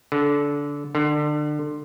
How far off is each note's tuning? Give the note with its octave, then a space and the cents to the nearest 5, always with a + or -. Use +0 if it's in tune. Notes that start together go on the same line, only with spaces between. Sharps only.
D3 -20
D3 +30